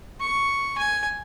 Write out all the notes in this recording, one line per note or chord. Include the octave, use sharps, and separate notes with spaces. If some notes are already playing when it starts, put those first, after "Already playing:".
C#6
G#5